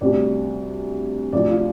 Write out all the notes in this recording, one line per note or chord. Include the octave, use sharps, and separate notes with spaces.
D2 C3 G3 D5
D2 C3 F3 D5
F4